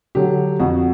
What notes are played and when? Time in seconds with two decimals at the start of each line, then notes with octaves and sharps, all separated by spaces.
0.15 D3 F#3 G4
0.60 F2 F#4